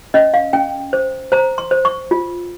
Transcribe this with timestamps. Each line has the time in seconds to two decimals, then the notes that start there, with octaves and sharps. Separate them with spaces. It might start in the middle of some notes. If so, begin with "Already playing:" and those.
0.14 C#4 D#5
0.34 F5
0.53 C#4 G5
0.93 C5
1.32 C5 A#5
1.58 C6
1.71 C5
1.85 C#6
2.11 F4